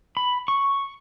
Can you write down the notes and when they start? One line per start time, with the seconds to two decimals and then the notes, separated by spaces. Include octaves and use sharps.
0.17 B5
0.48 C#6